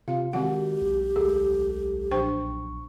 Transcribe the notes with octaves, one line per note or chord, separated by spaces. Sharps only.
C3 F4 F5
D#3 G#3 C4 F#4 G4 F#5
B1
D2 G#3 G#4 A4
A#1 D4 C5 G5 C#6